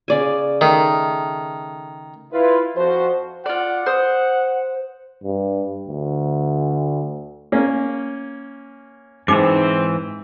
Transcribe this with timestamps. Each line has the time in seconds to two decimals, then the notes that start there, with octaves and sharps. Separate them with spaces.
0.08 C#3 D5 G#5
0.61 D#3 A3
2.33 E4 F4 B4
2.76 F2 F3 F#4 C5
3.46 F4 D5 F#5
3.86 C5 D#6
5.23 G2
5.87 D2
7.52 A#3 C#4
9.28 G#2 E3 C4 D#4 D6